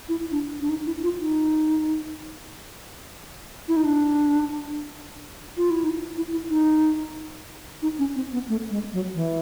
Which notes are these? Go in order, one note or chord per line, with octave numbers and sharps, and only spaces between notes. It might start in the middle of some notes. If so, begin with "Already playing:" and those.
E4
D4
D4
D#4
E4
F4
D#4
E4
D#4
D4
F4
E4
D#4
E4
E4
D#4
D#4
C#4
C4
B3
A3
G#3
F#3
E3